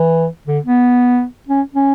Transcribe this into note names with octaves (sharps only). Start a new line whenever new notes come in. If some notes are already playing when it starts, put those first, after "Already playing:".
Already playing: E3
D3
B3
C#4
C#4